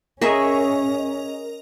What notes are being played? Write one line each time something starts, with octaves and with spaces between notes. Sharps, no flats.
C#4 G#4 A#4 C#5 D#5 E5